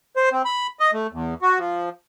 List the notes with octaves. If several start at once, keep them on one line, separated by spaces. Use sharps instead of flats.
C5
C4
B5
D#5
A3
E2
F#4
F3